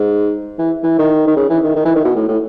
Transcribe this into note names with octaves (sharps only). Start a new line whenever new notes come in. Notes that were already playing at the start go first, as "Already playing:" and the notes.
Already playing: G#2
E3
E3
D#3
D#3
C#3
E3
D#3
D#3
E3
D#3
B2
A2
A2